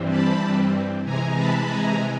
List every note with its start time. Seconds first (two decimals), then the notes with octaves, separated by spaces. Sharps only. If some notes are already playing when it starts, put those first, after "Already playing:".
Already playing: G2 E3 G3 C4
0.08 A5 B5
1.04 C3 E3 G#3 G#5 A#5
1.35 A5 B5
1.67 G#5 A#5